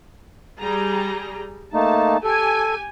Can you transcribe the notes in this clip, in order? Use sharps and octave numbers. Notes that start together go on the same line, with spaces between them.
G3 G#4 A#5
A3 A#3 D#4 A5
G4 A4 G#5